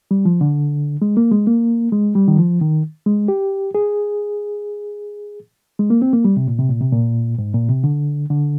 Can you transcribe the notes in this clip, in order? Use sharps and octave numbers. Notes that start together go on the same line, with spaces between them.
G3
F3
D3
G#3
A#3
G#3
A#3
G#3
G3
D#3
F3
D#3
G#3
G4
G#4
G#3
A#3
C4
A#3
G3
C3
A#2
C3
A#2
C3
A#2
G#2
A#2
C3
D3
D3